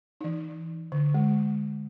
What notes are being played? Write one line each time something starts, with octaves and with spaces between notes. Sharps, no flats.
E3 D#4
D3
G#3